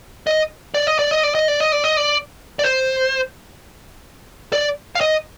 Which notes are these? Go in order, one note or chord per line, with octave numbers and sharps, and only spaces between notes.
D#5
D5
D#5
D5
D#5
D5
D#5
D5
D#5
D5
D#5
D5
D5
C5
D5
F5
D#5